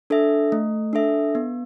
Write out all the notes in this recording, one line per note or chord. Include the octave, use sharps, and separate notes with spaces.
D4 A4 E5
A3
D4 A4 E5
B3